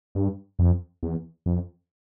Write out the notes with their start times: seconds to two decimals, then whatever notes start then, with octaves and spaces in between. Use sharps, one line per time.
0.15 G2
0.59 F2
1.03 E2
1.46 F2